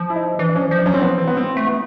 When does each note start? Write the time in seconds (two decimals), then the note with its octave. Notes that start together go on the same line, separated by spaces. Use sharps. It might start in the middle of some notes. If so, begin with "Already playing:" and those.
Already playing: F3
0.10 E4
0.16 D#4
0.39 E3 D4
0.49 D4
0.55 F3 C#4
0.71 F3
0.78 D4
0.86 F#3 C#4
0.94 C4
1.02 F3 B3
1.18 E3 C4
1.28 B3
1.33 G#3 C4
1.57 A3
1.67 B3